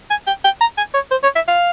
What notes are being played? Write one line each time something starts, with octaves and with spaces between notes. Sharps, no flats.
G#5
G5
G5
A#5
G#5
C#5
C5
C#5
E5
F5